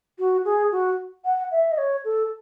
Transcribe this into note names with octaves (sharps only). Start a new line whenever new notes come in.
F#4
G#4
F#4
F#5
E5
D#5
C#5
A4